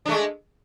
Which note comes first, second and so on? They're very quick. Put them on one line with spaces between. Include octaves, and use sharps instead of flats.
D4 A3 G#3